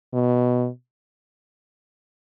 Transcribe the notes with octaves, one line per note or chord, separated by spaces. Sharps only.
B2